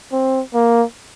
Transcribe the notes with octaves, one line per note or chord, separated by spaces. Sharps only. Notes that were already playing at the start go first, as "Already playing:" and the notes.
C4
A#3